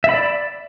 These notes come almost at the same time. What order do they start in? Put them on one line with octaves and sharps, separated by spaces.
E5 B5 D5